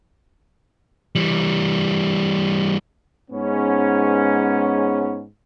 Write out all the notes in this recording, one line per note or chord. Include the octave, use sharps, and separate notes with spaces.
E3 G3
G#2 B3 C#4